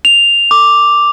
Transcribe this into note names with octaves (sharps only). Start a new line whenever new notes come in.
F7
D6